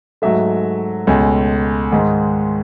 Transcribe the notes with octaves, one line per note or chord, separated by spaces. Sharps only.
G#2 F#3 A3 E5
C#2 B2 A3 G#5
G#2 D#3 G#3